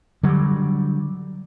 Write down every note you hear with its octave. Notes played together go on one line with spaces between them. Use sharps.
D3 F#3 G3